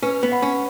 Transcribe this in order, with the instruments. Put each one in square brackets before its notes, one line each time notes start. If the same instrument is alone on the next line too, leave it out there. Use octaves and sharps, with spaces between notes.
[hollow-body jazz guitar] C#4 [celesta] B4
[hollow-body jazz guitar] B3
[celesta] F#5 B5
[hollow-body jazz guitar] C#4